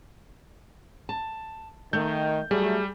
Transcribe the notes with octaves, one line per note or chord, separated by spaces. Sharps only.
A5
D#3 A3 G6
F#3 G3 A3 G#4